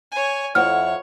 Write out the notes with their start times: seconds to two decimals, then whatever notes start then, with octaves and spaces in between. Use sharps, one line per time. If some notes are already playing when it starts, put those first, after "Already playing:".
0.12 C#5 G#5
0.55 F2 E4 C#5 F#5 F6